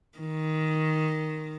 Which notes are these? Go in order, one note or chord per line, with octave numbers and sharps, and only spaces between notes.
D#3